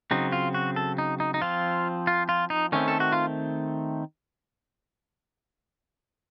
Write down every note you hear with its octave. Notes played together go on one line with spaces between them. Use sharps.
C#3 F#3 C4 D#4
F4
F#4
A4
D#4
D#4
D#4
F3 C4 F4
F4
F4
D#4
D#3 A3 C4 C#4
A4
F#4
F4